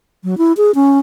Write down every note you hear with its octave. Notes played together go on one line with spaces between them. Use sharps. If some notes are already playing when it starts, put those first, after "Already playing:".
F#3
E4
G#4
C#4